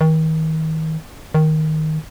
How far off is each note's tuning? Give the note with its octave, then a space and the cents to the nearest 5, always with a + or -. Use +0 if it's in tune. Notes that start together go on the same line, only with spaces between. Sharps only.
D#3 +35
D#3 +5